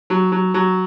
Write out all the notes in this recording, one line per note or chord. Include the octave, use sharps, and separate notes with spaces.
F#3
F#3
F#3